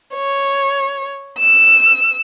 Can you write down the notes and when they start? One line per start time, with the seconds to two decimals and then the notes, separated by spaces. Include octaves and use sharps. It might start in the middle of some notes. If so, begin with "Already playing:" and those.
0.14 C#5
1.39 E6